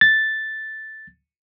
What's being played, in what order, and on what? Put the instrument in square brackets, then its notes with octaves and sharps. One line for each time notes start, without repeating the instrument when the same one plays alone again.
[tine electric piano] A6